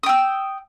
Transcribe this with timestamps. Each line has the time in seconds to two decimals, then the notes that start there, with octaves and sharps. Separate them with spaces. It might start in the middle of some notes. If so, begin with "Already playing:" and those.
0.03 D#6
0.06 G5
0.09 E6